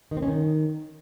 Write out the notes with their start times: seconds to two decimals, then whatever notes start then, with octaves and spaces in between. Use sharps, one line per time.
0.11 D#3
0.17 C4
0.22 C#4
0.28 D#3